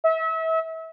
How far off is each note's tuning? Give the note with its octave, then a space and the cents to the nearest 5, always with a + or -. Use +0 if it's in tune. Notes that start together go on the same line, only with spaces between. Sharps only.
E5 -35